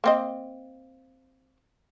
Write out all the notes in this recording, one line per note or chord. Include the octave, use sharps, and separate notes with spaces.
A#3 C4 D#5